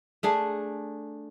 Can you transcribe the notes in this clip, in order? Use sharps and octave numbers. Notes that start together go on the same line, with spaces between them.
A3 D4 G#4